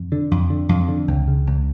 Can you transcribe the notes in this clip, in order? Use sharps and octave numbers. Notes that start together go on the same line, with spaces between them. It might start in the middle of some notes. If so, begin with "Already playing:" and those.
Already playing: F2
D3
F2
D3
F2
D3
C#2
C#3
C#2